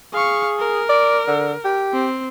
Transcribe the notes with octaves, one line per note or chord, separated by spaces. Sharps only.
G#4 F5 C#6
A#4
D5
D3
G4
C4